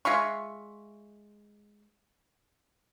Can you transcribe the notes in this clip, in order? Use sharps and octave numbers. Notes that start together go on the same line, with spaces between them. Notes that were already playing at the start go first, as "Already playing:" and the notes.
G#3 F4 E5 C#6